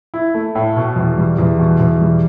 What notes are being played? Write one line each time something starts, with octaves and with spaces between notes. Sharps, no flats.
E4
A3
A2
B2
E2
G3
E2
B2
E2
G3